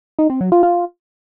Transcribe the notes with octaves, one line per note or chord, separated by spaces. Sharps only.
D#4
C4
F#3
F4
F4